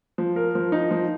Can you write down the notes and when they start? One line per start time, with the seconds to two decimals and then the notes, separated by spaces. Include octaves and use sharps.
0.18 F3
0.36 A#4
0.55 F3
0.72 D#4
0.91 F3